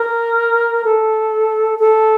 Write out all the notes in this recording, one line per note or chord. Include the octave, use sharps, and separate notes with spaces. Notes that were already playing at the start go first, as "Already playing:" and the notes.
Already playing: A#4
A4
A4